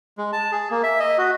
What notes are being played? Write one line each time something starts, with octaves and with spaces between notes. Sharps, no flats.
G#3
A5
G#4
A#3
E5
D#5
F#4